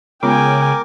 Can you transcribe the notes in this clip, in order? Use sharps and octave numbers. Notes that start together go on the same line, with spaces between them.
C#3 G#3 B3 F4 A#4 G5 G#5 D6